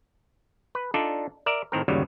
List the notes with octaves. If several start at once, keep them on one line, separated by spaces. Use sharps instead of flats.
B4
D4 D#4 F4 A4 D5
A#4 D5 E5
A2 D#3 C4 A#4
G1 D#2 C#3 F#3 G3